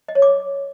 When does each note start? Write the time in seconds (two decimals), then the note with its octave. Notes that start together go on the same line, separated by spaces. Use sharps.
0.08 D#5
0.15 C#5
0.22 D6